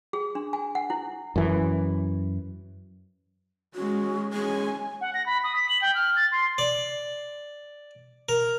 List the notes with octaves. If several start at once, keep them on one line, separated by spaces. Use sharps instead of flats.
G#4
D4
G#5
F#5
E4
F#2 E3
G#3 C#4 F#4
G#3 C#4 G#5
F#5
A#6
B5
D#6
B6
F#7
G5
F6
A6
C6
D5
A#4